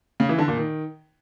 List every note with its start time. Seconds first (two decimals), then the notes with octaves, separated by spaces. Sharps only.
0.20 C#3
0.29 E3
0.38 D3
0.48 A#2
0.57 D#3